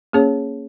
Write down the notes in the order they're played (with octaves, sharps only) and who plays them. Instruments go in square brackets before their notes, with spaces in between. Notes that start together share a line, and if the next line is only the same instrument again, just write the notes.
[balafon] A#3 C#4 G#4 C#5